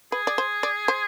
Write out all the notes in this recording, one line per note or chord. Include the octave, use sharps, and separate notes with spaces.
G#4 B4
D5
C5
D5
C5